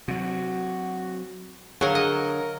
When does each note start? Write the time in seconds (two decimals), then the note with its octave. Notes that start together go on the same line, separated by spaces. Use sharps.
0.08 C3 F#3 F#4
1.81 D3 F#3 G#4 A#4 F5 C#6
1.95 A#4 D#5